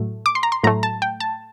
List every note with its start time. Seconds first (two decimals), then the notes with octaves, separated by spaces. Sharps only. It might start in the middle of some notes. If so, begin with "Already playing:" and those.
Already playing: A2 F#3 A3
0.26 D6
0.35 C6
0.43 A#5
0.52 C6
0.63 A2 F#3 A3 A#5
0.83 A5
1.02 G5
1.20 A5